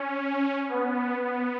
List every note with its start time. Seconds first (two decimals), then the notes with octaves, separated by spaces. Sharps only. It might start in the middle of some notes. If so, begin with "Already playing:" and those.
Already playing: C#4
0.68 B3
1.20 B3